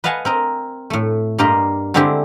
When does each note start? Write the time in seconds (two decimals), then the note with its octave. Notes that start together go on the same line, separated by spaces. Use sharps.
0.04 B4 D#5 F5 F#5 G#5 A5
0.25 C4 A#4 D#5
0.90 A2 A3
1.38 G2 A#3 G4 A#4 D#5 C6
1.94 D3 G#3 C4 D4 E4 G4